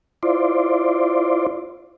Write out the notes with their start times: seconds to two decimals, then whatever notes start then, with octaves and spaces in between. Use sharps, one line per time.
0.23 E4 F4 C5 D5